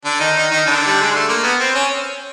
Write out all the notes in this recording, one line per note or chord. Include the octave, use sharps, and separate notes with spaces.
D3 D4
D#3 D#4
D#3 D#4
D#3 D#4
D3 D4
G3
G#3
A3
A#3
B3
C4
C#4